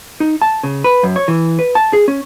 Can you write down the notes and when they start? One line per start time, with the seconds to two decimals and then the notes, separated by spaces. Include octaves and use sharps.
0.20 D#4
0.42 A5
0.63 C#3
0.84 B4
1.03 F#2
1.16 C#5
1.28 E3
1.59 B4
1.75 A5
1.93 G#4
2.08 C#4